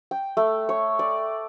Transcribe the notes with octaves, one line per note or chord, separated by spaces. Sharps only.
G5
A3
C#5
D5